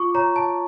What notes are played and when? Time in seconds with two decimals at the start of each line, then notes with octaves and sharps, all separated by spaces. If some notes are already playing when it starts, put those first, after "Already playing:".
Already playing: F4 C#6 D6
0.15 C#5 A#5
0.36 A5